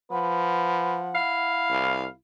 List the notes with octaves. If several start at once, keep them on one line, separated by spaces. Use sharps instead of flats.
F3 B4 F#5
E4 F5
C2